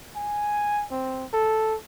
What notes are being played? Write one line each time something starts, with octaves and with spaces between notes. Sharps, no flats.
G#5
C4
A4